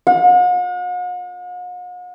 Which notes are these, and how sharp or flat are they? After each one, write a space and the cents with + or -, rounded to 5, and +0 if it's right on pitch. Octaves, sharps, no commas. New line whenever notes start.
F#5 -45